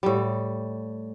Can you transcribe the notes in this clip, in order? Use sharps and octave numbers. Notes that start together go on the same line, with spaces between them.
A2 G3